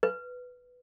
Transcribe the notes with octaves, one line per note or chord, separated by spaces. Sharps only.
B4